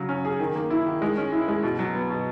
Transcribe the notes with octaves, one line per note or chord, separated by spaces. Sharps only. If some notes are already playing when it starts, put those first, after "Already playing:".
Already playing: C#3 F#3
C#4
G#4
D#3
A#3
E4
D#3
G#3
C#4
E4
G#3
B2
F#3
B3
B2